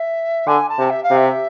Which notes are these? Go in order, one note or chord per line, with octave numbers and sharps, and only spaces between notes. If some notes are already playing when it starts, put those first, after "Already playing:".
Already playing: E5
D3 G#5
A5
C3
E5
F5
C3
E5